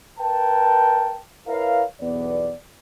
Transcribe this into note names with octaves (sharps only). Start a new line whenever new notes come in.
A#4 B4 G5 A5
E4 A#4 B4 C#5 F5
B1 E2 B3 D5